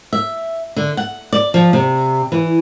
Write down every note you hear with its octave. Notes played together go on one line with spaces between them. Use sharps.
E5
D3
F#5
D5
F3
C3
E3